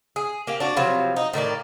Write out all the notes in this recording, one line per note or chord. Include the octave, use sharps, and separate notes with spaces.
G#4
A#3 G4 F5
D4 F#4
C3 F3 F#3 B3
D#4
A2 D#3 A#3 D5